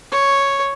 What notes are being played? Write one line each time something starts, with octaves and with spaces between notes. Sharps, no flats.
C#5